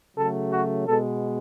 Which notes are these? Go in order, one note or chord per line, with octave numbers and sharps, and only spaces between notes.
C#3 F#3 A3 A4
F#4
B2 G#3 B3 A4